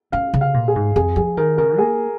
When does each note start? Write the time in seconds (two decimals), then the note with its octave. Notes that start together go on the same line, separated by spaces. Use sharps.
0.12 C#4 F5
0.34 C#3
0.41 F5
0.54 A#2
0.68 G#4
0.76 G#2
0.96 F2 G#4
1.16 F3 G#4
1.37 D#3 A#4
1.58 C#3 A#4
1.78 A#3 G#4